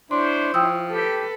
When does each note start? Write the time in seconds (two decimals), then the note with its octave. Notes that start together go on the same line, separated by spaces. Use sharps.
0.11 D4 E4 C5 C#5 C6
0.54 F3 G5 D#6 E6
0.91 G4 A4 B4